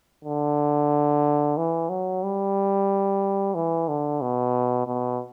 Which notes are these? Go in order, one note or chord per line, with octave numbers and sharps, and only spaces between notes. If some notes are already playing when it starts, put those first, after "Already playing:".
D3
E3
F#3
G3
E3
D3
B2
B2